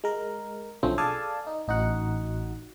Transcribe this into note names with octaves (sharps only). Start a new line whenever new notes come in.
G#3 A#4
B1 D3 F3 A3 C4 C#4
G#4 A4 D5 F5 G#5 A5
D#4
A1 D#4 F#4 F#5